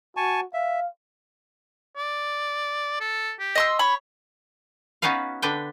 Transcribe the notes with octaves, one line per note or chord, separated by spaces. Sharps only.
F#4 G#5 A5 C#6
E5 F5
D5
A4
G4
D#5 C6 E6
C#5 B5
B3 C#4 D#4 F#4 B4 F5
D3 D4 B4 G5